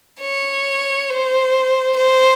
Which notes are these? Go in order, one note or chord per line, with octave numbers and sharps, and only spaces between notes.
C#5
C5
C5